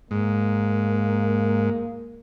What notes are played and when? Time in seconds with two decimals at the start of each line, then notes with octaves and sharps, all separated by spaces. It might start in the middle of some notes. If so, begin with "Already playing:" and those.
0.11 G#2 A#3